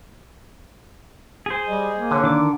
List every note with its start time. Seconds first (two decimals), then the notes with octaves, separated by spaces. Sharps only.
1.46 G#4 C5
1.67 G3 D#5
1.98 A#3
2.11 D3 C#5
2.23 D#3 D4 D6